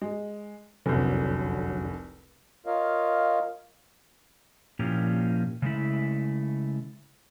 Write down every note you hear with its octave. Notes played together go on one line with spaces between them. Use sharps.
G#3
F1 C2 F#2 D3 F#3
F4 A#4 C#5 D#5 F5
A#2 F3 A#3 C#4 E4 G4
C#3 G#3 A3 E4